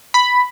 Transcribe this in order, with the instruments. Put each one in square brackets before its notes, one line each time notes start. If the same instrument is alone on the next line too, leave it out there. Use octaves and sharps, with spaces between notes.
[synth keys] B5